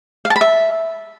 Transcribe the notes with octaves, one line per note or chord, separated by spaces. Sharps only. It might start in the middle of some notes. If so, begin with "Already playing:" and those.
F5
A5
B5
E5